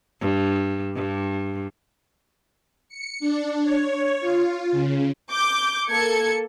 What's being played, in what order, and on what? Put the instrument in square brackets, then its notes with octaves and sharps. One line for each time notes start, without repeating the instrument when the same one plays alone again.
[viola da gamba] G2
G2
[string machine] C#7
D4
C#5
F4
C#3
[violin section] D6 G6
A#3 A4 G#6 C#7